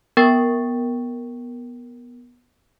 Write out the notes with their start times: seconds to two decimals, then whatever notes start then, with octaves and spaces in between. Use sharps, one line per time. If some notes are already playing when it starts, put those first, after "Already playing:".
0.17 B3 A#4 G5 C#6 A6